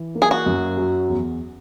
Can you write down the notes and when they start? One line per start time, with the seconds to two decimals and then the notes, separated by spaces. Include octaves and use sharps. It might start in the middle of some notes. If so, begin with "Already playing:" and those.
Already playing: E3
0.15 A#3
0.22 G#4
0.31 F#4
0.46 F#2
0.77 F#3
1.08 E2